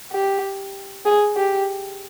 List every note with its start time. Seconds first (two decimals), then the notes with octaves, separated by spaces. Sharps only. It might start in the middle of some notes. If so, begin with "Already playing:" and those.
0.12 G4
1.06 G#4
1.37 G4